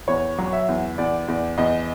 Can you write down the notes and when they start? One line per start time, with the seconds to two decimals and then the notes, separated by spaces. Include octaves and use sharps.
0.08 E2 C#5
0.38 F#3
0.53 E5
0.69 E2
0.98 E2 D5
1.28 E2 D5
1.58 E2 D#5